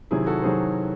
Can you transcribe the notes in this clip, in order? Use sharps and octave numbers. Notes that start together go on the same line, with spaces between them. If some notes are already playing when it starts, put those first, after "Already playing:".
C3 D#3 F#3 E4 G#4
F#4 A4
C3 D#3 F#3 G#4 C5